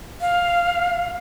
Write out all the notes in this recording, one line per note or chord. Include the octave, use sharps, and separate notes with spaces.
F5